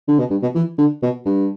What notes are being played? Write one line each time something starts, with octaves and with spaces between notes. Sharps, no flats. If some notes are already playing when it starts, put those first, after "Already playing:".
D3
B2
G2
B2
E3
D3
B2
G2